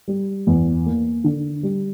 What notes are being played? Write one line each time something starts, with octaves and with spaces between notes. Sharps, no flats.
G3
E2
A#3
D3
G3